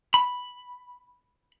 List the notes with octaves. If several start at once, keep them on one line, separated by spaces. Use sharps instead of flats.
B5